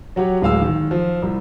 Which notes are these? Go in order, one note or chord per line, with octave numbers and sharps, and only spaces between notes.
F#3 F#4 G4 C#5
D1 G#3 F5 E6
D#3
F3
C2